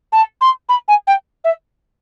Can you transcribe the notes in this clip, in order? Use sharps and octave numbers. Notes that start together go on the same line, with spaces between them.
A5
C6
B5
G#5
G5
E5